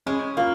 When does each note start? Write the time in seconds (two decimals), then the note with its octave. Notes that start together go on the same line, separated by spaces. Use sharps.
0.06 G#3 C#4
0.37 A#3 F4